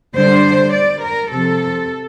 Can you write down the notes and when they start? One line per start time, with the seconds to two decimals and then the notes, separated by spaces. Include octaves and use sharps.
0.15 D3 G3 D4 C5
0.73 D5
1.01 A#4
1.30 C3 F3 C4 A4